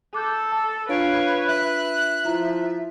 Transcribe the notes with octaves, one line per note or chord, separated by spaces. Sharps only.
A4 D6 F#6 G6
A5 E6
D4 F4 B4 C#5 F5 D7
E5 F#6
F3 E4 F4 A#5